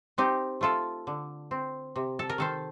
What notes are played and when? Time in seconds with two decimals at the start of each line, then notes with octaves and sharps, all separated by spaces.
0.18 C4 D#4 G4
0.61 A3 F4 A4
1.07 D3
1.51 C4
1.96 C3
2.19 A4
2.29 A#4
2.38 D#3 A4 C5